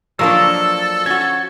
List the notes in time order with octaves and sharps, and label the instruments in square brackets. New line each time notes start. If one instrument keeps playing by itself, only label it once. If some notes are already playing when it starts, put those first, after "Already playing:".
[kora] F3 A#4 D#5 [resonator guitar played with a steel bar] F#3 A#3 D4 [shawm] A4 [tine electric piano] E6
[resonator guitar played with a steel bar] C#4 F#4 [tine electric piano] G#6